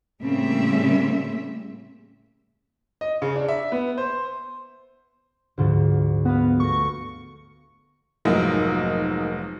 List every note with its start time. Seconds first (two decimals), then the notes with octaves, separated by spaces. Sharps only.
0.21 A2 C#3 G3 A#3 C4 E5
3.01 D#5
3.22 C#3
3.36 D4
3.48 E5
3.72 B3
3.98 C5
5.58 D2 G#2 F3
6.25 B3 F#4 B4 F5
6.60 A3 C#6 A#6
8.25 F1 G#2 F#3 A#3 D#4